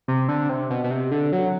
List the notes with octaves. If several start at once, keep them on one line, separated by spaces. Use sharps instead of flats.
C3
D3
C3
B2
B2
C3
D3
F#3